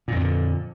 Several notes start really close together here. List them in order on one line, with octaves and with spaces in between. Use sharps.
A#2 F2 D#3 D3